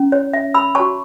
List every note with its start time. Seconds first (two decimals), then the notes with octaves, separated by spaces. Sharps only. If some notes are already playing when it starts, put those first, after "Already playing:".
Already playing: C#4 E4
0.12 C#5
0.33 E5
0.54 B5 E6
0.75 F#4 C#5 A5 C#6